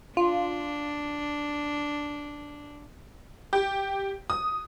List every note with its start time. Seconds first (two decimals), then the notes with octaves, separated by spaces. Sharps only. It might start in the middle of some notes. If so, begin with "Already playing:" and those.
0.17 D4 F4
3.53 G4
4.30 D#6